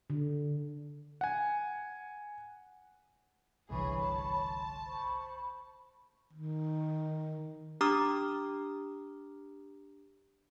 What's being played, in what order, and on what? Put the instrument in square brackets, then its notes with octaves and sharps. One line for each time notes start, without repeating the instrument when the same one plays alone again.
[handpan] D3
[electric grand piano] F#5 G#5
[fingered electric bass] G1 C2 D3 [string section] E3 G#4 [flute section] C#5 B5 C#6
[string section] A5
[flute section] C6
C5 B5 C#6
[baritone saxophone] D#3
[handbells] D4 G4 A#5 D6 D#6 F6